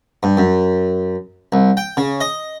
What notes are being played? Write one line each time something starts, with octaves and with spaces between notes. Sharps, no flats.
G2
F#2
C2
G5
C#3
D#5